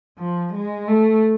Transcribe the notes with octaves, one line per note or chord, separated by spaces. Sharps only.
F3
G#3
A3